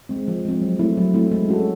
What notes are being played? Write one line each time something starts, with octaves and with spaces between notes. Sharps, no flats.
G#3 C4
F3
G#3 C4
F#3
A3 C4 E4
F#3
A3 C4 E4
G#3
C#4 F#4 A4